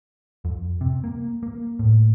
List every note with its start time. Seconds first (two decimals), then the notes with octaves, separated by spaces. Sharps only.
0.45 F2
0.81 C3
1.04 A#3
1.43 A#3
1.79 A2